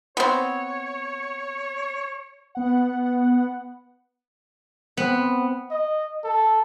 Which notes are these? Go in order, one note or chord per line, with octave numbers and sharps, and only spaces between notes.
B3 C4 C#5
B3 F#5
B3 C4
D#5
A4